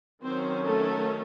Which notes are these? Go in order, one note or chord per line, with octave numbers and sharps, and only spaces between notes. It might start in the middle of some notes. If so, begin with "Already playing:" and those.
D#3 F#3 C4 C#4 C5
A3 A4